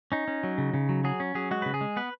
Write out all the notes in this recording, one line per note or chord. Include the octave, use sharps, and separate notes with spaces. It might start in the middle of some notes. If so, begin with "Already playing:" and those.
C#4 D#4
C#4
F#3
C#3
C#3
F#3
F#3 G#4
C#4
F#3 G#4
G#3 F#4
C#3 B4
G#4
G#3
B3 B4